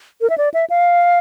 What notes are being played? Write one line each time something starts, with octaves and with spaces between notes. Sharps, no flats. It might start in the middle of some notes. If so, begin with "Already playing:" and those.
A#4
E5
D5
E5
F5